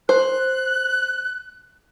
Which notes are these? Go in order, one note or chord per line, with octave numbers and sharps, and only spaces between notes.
C5 F#6